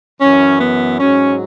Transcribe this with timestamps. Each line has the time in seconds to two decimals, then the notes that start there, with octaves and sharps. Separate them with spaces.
0.21 F#2 E3 C#4
0.61 B3
1.00 G#2 F#3 C#4